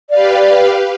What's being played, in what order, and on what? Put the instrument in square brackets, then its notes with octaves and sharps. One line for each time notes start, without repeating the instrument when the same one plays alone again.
[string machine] G4 B4 F5 [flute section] D5